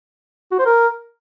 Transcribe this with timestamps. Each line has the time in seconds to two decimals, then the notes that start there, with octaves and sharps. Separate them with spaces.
0.52 F#4
0.59 C5
0.66 A#4